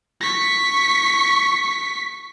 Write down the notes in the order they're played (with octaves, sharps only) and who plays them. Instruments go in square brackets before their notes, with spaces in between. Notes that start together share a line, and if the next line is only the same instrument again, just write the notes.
[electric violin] C#6 B6